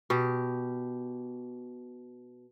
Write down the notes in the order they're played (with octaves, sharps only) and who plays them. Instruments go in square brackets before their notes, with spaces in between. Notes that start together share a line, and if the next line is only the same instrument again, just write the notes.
[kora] B2 G4